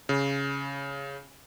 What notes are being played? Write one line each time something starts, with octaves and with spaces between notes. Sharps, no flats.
C#3